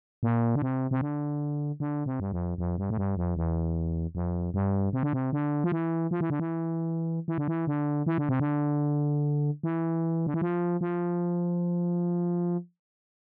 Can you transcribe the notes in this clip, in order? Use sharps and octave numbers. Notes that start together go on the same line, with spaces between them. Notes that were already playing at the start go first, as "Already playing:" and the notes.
A#2
D3
C3
C3
D3
D3
C3
G2
F2
F2
G2
A2
G2
F2
E2
F2
G2
C3
D3
C3
D3
F3
E3
F3
E3
D3
E3
E3
D3
E3
D3
E3
D3
C3
D3
E3
D3
E3
F3
F3